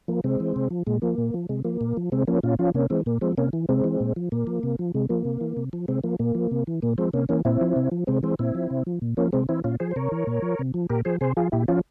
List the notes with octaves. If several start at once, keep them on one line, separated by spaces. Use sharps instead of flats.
F3 A#3
C3 G#3 C4
E3
C3
F3
A#2 G#3
F3 A#3
A#2
F3
C3 G#3
F3 A#3
A#2
F3
C3 G#3 C4
F3 A#3 C#4
A#2 C#4 F4
F3 C#4 F4
C3 A#3 C#4
E3 G#3 C4
A#2 A#3
F3 G#3 C4
C3 A#3 C#4
E3
C3 G#3 C4
E3
A#2
F3
A#2 A#3
F3
C3
F3
C3 G#3
F3 A#3
C3
E3
C3
F3
C3 G#3 C4
F3 A#3
A#2 A#3
F3
C3
E3
A#2 A#3
F3 G#3 C4
C3 A#3 C#4
E3 A#3 C#4
A#2 C4 E4
F3
C3
F3
C3 G#3 C4
E3 G#3 C4
A#2 C4 E4
F3
C3
F3
A#2
F3 A#3 C#4
C3 G#3 C4
E3 C4 E4
A#2 C#4 F4
F3 G#4 C5
C5
C3 A#4 C#5
E3
A#2
F3
C3
F3
A#2 G4 A#4
F3 G#4 C5
C3 G#4 C5
F3 F4 G#4
A#2 E4 G4
F3 C#4 F4